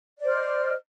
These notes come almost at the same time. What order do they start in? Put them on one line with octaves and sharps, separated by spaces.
D5 C5 F6 D#5